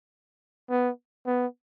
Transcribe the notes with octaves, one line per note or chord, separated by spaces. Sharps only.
B3
B3